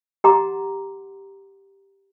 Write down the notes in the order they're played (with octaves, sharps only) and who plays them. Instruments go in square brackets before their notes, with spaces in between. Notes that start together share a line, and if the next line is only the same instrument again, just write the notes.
[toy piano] G4 D#5 F#5 A#5 C6 D6